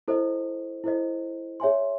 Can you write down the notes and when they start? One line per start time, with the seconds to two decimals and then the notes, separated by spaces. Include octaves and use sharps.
0.08 E4 A4 C5 D#5
0.84 E4 A4 C5 D#5
1.60 G#4 C#5 E5 G#5 C6